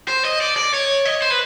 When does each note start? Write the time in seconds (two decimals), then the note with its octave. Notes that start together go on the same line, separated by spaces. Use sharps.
0.08 C5
0.25 D#5
0.41 D5
0.57 D5
0.74 C#5
1.06 D#5
1.22 C5
1.30 B4